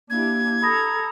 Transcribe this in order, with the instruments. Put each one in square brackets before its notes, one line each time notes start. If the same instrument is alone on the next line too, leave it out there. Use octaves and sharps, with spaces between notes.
[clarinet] A#3 [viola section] D4 E4 G4 [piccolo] G#6
[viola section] A4 A#5 [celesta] B5 D#6 A#6